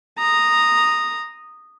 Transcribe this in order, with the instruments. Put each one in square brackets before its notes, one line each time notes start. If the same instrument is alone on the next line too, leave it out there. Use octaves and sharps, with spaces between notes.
[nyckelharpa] A#5 D#6